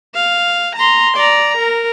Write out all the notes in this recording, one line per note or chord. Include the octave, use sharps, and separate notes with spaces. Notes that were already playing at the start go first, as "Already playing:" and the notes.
F5
A#5 C6
D5 A#5
A#4